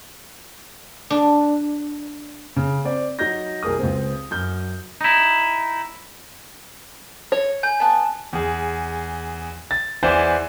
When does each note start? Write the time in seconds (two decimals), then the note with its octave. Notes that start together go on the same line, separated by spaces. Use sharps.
1.10 D4
2.56 C#3
2.85 C4 D5
3.19 F#3 D#4 G6 A#6
3.63 C2 G#4 A#4 D#6
3.79 C#2 C4
4.31 F#2 G6
5.01 D#4 E4
7.32 C#5
7.63 G#5 G6
7.80 B3 A5
8.33 E2 G#4
9.71 A6
10.03 E2 E3 E4 C5 D5 G#5